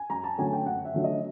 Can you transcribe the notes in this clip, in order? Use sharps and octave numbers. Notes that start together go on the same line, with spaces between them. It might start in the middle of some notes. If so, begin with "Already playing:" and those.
Already playing: G#5
F#2 A#5
A5
D3 F#3 A3 C#4 G#5
G5
F#2 F#5
E5
D3 F#3 A3 C#4
D#5